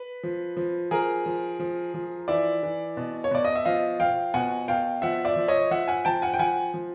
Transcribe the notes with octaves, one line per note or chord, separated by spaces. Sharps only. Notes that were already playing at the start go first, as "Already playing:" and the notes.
Already playing: B4
F3
F3
F3 G#4 A#4
F3
F3
F3
E3 D5 E5
E3
B2
C#5
B2 D5
D#5
E5
F3 D#5 F5
F3 F5 G5
B2 F#5 G#5
B2 F5 G5
F3 E5 F#5
D5 E5
F3
C#5 D#5
F3 E5 F#5
F#5 G#5
F3 G5 A5
F#5 G#5
G5
F3 F#5 G#5
F3